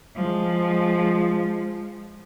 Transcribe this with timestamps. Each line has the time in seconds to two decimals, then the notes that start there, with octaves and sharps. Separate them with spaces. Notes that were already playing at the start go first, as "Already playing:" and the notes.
0.16 F3 G#3